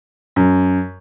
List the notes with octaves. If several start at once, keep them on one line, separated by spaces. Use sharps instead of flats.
F#2